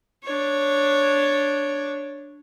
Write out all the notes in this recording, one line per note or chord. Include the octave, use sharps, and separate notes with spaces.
D4 C#5